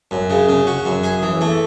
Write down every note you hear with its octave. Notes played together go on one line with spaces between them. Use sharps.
F#2
C#3
C#3
F#4
F#2
G#4
E3
A3